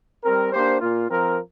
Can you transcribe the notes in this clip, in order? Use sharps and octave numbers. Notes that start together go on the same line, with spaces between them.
G3 C4 A#4
A#3 D4 G4 C5
A#2 A#3 F4
F3 C4 A#4